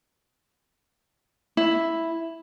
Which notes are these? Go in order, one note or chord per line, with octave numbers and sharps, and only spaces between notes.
E4